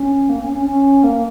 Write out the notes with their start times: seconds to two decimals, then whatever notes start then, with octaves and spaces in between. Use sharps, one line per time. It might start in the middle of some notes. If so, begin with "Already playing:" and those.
Already playing: C#4
0.29 A#3
0.41 C#4
0.53 C#4
0.66 C#4
1.04 A#3